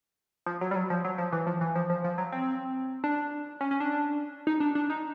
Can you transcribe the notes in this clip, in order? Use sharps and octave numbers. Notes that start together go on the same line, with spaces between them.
F3
F#3
G3
F#3
F3
F#3
F3
E3
F3
E3
F3
F3
F3
F#3
C4
D4
C#4
C#4
D4
D#4
D4
D4
D#4